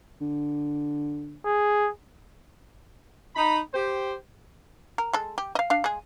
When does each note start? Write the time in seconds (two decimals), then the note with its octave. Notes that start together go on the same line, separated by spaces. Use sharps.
0.21 D3
1.45 G#4
3.36 D#4 B5
3.74 G4 C5
4.98 A#4
5.13 G#3 A4
5.38 G4
5.55 D#5 F5
5.70 D4 F5
5.84 G#3 G#4